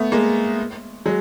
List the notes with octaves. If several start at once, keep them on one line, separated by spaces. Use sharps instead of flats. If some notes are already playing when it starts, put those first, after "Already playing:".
Already playing: A3 B3
G#3 A#3
F#3 G#3